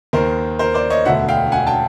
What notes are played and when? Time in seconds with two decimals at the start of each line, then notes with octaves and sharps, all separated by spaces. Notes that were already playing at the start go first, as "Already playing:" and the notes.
0.13 D#2 D#3 A#4 C5
0.59 A#4 C5
0.74 C5 D5
0.90 C#5 D#5
1.05 E1 D2 D3 E5 F#5
1.29 F5 G5
1.52 F#5 G#5
1.67 G5 A5